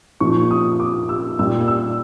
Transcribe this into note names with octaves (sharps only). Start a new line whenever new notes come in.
A#2 F3 C#6
D#6
D6
E6
A#2 G3 E6
E6